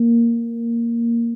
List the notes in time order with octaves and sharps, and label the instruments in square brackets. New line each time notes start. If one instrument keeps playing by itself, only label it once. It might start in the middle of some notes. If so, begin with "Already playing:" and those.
Already playing: [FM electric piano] A#3